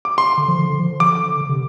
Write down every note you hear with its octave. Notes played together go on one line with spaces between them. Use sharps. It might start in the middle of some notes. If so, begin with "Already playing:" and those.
D6
C6
D3
F3
D3
D3
F3
D3 D6
D3
C3